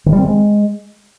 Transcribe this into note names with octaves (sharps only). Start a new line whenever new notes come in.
D#3
G3
C4
G#3